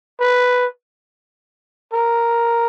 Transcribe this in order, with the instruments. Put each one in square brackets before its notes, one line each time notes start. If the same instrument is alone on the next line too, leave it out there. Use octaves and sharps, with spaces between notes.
[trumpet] B4
A#4